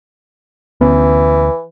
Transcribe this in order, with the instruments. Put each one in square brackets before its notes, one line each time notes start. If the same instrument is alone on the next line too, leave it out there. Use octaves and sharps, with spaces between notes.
[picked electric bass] D2 B3 C#4 [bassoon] E3